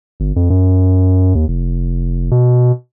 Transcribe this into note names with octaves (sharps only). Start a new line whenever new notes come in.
G1
F2
F#2
D#2
F1
B2